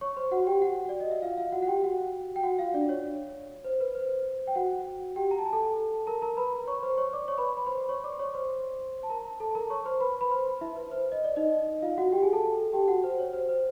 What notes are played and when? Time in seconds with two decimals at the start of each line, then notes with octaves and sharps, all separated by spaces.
0.01 C#5 C#6
0.16 C5 C6
0.31 F#4 F#5
0.47 G4 G5
0.62 F#4 F#5
0.89 D5
1.00 D#5
1.11 E5
1.22 F4 F5
1.38 F4 F5
1.52 F#4 F#5
1.63 F#5
1.67 G4 G5
1.83 F#4 F#5
2.36 G5
2.43 F#4 F#5
2.59 F4 F5
2.74 D4 D5
2.89 C#5
3.65 C5
3.80 B4
3.95 C5
4.48 G5
4.55 F#4 F#5
5.16 G4 G5
5.31 A#5
5.39 A5
5.45 G#5
5.53 A4 A5
6.07 A#4 A#5
6.22 A#4 A#5
6.37 B4 B5
6.53 A#4 A#5
6.67 C#5 C#6
6.83 C5 C6
6.98 C#5 C#6
7.13 D5 D6
7.28 C#5 C#6
7.38 B4 B5
7.48 C6
7.57 B5
7.66 C5 C6
7.89 C#5 C#6
8.04 D5 D6
8.12 C6
8.19 C#5 C#6
8.34 C5 C6
9.03 A5
9.10 A#4 A#5
9.40 A4 A5
9.55 A#4 A#5
9.70 C#5 C#6
9.85 C5 C6
10.00 B4 B5
10.21 B4 B5
10.31 C5 C6
10.61 E4 E5
10.76 B4
10.91 C5
11.12 D#5
11.24 D5
11.36 D#4 D#5
11.82 F4 F5
11.97 F#4 F#5
12.12 G4 G5
12.23 G#4 G#5
12.33 A4 A5
12.73 G4 G5
12.88 F#4 F#5
13.04 C5
13.19 C#5
13.33 C5
13.49 C5